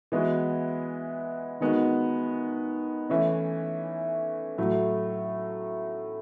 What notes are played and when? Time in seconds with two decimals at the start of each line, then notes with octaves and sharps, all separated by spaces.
0.12 E3 G#3 B3 F#4
1.61 D#3 G#3 B3 F#4
3.09 E3 A3 C#4
4.58 A2 F#3 A3